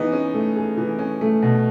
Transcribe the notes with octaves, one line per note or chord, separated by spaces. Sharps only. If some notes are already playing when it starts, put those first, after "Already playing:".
Already playing: E3 B3 D#4 G#4
C#4
A3
G#4
E3
C#4
A3
B2